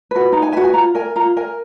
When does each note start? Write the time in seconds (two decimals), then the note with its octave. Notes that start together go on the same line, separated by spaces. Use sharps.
0.11 F#4 B4
0.32 D#4 A#5
0.42 G#5
0.52 F#4 B4 G#5
0.64 G#5
0.74 F4 A#5
0.95 A#4 G#5
1.16 F4 A#5
1.37 A#4 G#5